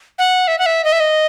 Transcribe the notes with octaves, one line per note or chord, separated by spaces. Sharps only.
F#5
E5
F#5
E5
D#5
E5
D#5